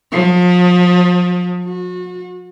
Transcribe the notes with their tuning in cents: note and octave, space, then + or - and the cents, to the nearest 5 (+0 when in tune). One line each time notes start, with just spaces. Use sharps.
F3 +35
F#4 -35